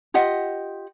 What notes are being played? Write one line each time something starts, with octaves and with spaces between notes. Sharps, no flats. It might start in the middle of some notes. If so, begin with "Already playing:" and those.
F4 G4 D#5 F#5